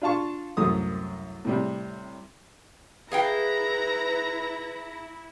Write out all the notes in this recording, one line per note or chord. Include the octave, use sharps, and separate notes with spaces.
D4 F4 F5 A5 C#6
C2 F#2 A2 A3 D#6
A2 C3 G3
E4 G#4 B4 F5 G5 A#5